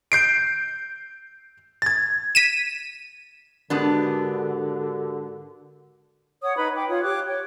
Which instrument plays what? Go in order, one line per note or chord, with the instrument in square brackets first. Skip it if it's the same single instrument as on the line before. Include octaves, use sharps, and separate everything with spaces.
[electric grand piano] G6 C7 D7
G#6 A6
[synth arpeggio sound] B6 D#7 E7
[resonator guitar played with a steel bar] G#2 B3 D4 [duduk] D3 [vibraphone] F#4 G4 A#4
[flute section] C#5 F#5 D#6
D#4 B4 B5
G5 D6
F4 C#5 D#6
G4 C#5 D6 F#6
C#5 G5